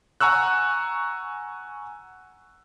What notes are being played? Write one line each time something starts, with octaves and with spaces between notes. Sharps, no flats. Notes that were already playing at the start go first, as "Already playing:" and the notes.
F#5 G#5 A#5 C#6 E6 F#6